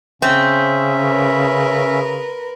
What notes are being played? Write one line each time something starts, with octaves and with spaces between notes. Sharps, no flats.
C#3 C4 C#4 E5
A#4 B4